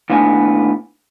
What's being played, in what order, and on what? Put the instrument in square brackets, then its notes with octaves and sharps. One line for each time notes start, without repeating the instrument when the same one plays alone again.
[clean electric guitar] D#2 A2 B3 D4 G#5